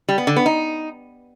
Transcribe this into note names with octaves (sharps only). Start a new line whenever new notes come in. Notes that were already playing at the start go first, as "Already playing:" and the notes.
G3
B3
D3
B3
D#4